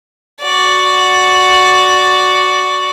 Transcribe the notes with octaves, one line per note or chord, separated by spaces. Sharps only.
F#4 D5